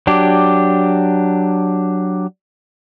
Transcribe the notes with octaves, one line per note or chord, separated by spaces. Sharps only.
F#3 D4 G4